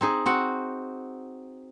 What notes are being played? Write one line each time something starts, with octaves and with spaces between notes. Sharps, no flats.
C4 D#4 G#4
C4 F#4 F#5